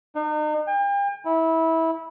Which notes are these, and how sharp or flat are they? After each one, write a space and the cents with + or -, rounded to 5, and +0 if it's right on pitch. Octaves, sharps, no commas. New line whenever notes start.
D#4 -40
G5 +40
E4 -20